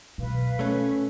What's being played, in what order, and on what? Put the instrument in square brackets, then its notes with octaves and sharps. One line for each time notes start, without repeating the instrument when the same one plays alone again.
[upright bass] B2 F#3 [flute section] B4 F5
[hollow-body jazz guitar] A3 C#4